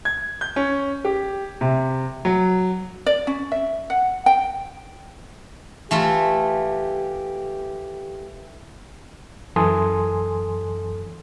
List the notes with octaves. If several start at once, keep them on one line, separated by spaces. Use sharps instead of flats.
G#6
G6
C#4
G4
C3
F#3
D5
C#4
E5
F#5
G5
E3 A3 F4 G4
F#2 E3 A4 G#5 C6 D#6